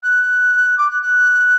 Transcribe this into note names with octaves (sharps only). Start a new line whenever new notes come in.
F#6
D6
F#6
F#6